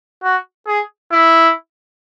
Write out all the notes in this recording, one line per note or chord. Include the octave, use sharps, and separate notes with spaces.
F#4
G#4
E4